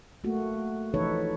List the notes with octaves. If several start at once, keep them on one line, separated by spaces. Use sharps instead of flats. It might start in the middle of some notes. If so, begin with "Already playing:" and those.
A3 A#3 F#4
E3 F3 D#4 A4 B4 C#5